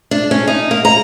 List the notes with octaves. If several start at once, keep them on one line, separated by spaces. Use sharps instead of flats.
D4
C#4
D#4
A#3
A#5